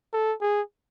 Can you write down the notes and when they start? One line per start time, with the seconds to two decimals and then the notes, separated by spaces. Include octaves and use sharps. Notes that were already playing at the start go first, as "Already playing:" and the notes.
0.13 A4
0.41 G#4